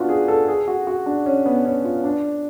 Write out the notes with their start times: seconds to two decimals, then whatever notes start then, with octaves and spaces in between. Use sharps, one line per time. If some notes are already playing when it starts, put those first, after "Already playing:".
Already playing: B3 D4 F4 F#4
0.09 G#4
0.28 A4
0.48 G#4
0.68 F#4
0.87 F#4
1.06 D4
1.26 C#4
1.46 B3
1.65 C#4
1.85 F4
2.04 D4